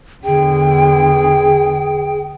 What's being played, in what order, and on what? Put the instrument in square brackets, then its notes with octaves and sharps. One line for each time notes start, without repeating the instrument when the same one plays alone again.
[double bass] E2 D3 [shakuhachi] G#4 [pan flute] G5